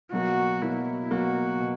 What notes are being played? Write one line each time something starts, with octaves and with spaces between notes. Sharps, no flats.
B2 F#3 A#3 F#4
B2 F#3 A#3 E4
B2 F#3 A#3 F#4
B2